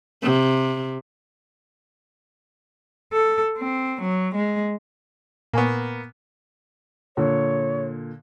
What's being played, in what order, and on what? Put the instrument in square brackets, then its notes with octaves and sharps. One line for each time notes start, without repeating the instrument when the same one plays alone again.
[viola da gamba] C3
[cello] A4
C4
F#3
G#3
[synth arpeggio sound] A#2 G#5 C#6 [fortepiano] A#3 B3
[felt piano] A#2 D3 [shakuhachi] C#5